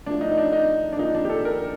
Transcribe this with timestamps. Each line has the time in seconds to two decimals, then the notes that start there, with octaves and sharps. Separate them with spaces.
0.06 A2 F3 D4
0.21 D#4
0.32 D#4
0.38 D4
0.52 D#4
0.93 D4
0.98 A#2 F3 D#4
1.15 D4
1.25 G4
1.30 A4
1.45 A#4